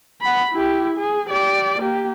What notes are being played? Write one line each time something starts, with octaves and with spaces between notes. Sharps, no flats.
F#5 B5
E4 G4
G#4
G4 D5
A#3 G4